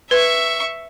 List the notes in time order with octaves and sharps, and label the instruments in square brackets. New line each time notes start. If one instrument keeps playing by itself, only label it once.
[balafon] B4 [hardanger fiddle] E5 C#6